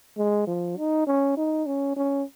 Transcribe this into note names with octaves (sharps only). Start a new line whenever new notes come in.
G#3
F3
D#4
C#4
D#4
C#4
C#4